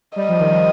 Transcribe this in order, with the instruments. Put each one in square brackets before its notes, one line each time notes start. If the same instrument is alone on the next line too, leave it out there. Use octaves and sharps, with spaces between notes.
[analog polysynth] G3 [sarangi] D#5
[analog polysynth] F3
D#3
F3